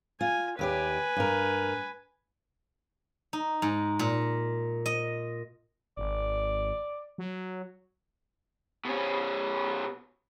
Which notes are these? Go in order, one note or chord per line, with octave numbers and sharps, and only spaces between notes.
F4 G#5
D#2 G4 B4 D5 G#5
G2 A#4
D#4
G#2
A#2
D#5
G#1 D5
F#3
B2 C#4